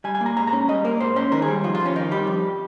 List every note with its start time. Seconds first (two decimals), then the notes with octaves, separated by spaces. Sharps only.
0.04 G3 G#5
0.15 G#5
0.21 A#3
0.26 A#5
0.37 G#2 A#5
0.47 A#5
0.53 C#4
0.68 G3 D#5
0.84 A#3 A#4
1.00 G#2 C5
1.16 C#4 C5
1.32 D#3 A#4
1.42 G#4
1.47 G3
1.64 F2 F4
1.75 F4
1.80 F2
1.86 C#4
1.96 D#3 D#4
2.11 G3 G4
2.27 F2